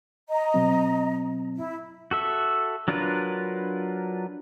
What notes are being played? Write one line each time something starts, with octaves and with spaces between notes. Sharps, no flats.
D#5 A#5
B2 F#3 C4
E4
F#4 A4 E5
F#3 D4 F4 A#4 B4